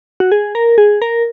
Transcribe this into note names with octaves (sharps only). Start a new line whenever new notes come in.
F#4
G#4
A#4
G#4
A#4